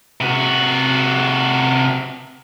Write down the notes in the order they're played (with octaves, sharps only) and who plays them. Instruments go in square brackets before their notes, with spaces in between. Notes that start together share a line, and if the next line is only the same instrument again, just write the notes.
[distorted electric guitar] C3 F#4